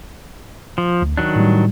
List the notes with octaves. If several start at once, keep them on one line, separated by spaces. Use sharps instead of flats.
F3
D2
D#3 F#3 D4 F#6
A2 G3